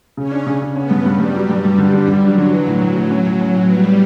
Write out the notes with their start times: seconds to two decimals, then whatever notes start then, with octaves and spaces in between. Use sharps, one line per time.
0.17 C#3 C#4
0.32 D4
0.47 C#3
0.62 C#3
0.75 B3 C#4
0.91 G2
1.06 G2 G3
1.20 G2
1.35 F#3
1.49 G2
1.65 G2
1.78 D3
1.93 D3 G3
2.08 D3
2.23 F#3 D4
2.38 D3
2.52 E3
2.67 A2
2.82 A2
2.97 A2
3.11 C#4
3.26 A2
3.40 C#4
3.55 A2
3.70 G3 B3
3.84 B3